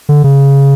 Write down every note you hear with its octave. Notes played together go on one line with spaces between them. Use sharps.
D3
C#3